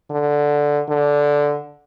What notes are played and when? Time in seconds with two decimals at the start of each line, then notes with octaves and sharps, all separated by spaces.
0.10 D3
0.89 D3